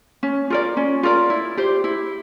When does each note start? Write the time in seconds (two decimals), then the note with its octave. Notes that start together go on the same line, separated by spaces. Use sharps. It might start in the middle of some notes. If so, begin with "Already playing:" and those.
0.23 C#4
0.50 F4 A#4 D5
0.77 C#4
1.03 F4 A#4 D5
1.30 E4
1.57 G4 C5
1.84 E4